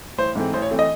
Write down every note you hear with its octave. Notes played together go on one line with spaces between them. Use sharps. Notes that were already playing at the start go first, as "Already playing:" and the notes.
A1 C5
G#2 E3 A3 C4
A1 C5
C#5
E3 A3 C4
D#5